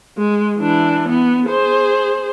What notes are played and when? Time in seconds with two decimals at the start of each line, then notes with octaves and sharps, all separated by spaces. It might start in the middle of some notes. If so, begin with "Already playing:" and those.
0.18 G#3
0.59 E3 D4
1.09 B3
1.47 G#4 C5